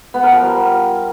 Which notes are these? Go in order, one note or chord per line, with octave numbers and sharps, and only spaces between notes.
B3
A#4
F3
G3